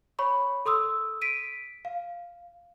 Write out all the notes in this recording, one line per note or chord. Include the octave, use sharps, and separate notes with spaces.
C#5 B5 C#6
A4 C6 D#6 E6
B6 D7 D#7
F5